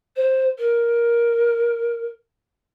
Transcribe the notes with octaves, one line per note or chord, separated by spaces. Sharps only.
C5
A#4